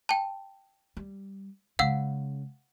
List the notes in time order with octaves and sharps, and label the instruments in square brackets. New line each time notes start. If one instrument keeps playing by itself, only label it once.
[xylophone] G5 A5
[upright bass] G3
[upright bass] C#3 G#3 [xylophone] F5 F#5 E6